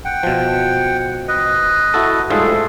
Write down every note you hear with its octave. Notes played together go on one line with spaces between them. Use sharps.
F#5 G5
B2 F3
B4 D#5
E4 F#4 A4
G#2 G3 A3 F4 G#4 A4